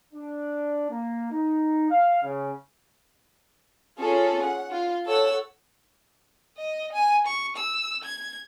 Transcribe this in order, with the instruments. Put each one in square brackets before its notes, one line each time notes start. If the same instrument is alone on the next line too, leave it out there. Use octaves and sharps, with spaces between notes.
[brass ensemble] D4
A#3
D#4
F5
C#3
[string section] C#4 F4 G#4 A4
F#5
F4
A4 C#5 F#5 E6
[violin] D#5
G#5
C#6
E6
G#6